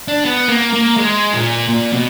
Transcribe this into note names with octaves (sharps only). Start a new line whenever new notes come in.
D4
B3
A#3
A#3
G#3
A#2
A#2
B2